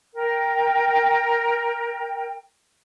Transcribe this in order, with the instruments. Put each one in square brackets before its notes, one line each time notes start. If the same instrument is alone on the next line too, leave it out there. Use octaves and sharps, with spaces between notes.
[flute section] A#4 G5